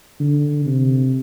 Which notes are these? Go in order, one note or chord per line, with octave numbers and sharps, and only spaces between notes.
D3
C3